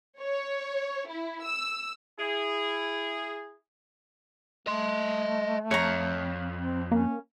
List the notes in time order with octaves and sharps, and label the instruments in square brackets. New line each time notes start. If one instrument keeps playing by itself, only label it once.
[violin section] C#5
E4
E6
[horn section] E4 G#4
[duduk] A3 [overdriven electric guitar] D#5 C6
[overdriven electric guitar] F2 [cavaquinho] C#5 A#5
[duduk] C4
[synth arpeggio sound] A#3 [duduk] C#4